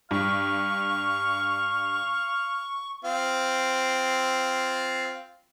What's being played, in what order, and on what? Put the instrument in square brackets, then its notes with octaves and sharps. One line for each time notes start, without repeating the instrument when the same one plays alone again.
[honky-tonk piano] G2 [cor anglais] F5 [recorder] C#6
[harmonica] C4 F4